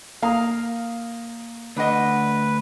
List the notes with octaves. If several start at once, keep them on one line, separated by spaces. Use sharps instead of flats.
A#3 F5 A#5 D#6
D2 D4 B4 D#5 F#5